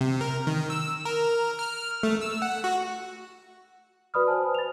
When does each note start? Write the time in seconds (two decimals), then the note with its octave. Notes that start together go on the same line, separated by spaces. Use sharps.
0.01 C3
0.21 A#4
0.47 D#3
0.70 E6
1.05 A#4
1.59 F6
2.03 A3
2.21 E6
2.42 F#5
2.64 F#4
4.14 F#4 B4 D5 B5 D#6 F6
4.28 C5 G#5 A5
4.55 A6 F7